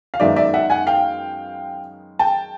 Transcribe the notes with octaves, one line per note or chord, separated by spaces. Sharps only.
F5
F#2 D#3 G#3 B3 D#4 D5 E5
D5 E5
E5 F#5
F#5 G#5
F5 G5
G5 A5